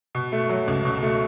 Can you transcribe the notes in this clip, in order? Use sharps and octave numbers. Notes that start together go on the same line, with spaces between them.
B2
A3
F#3
C#2
B2
A3